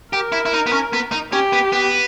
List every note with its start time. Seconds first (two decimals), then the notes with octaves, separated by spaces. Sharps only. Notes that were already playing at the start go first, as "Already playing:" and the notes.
0.13 G4 A#4
0.32 E4
0.46 E4
0.53 D#4
0.66 B3
0.73 C#4
0.93 B3
1.12 D#4
1.32 C#4 G4
1.53 B3
1.72 B3